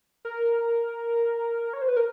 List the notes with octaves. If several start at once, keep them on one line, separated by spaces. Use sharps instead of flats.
A#4
C#5
C5
B4
A#4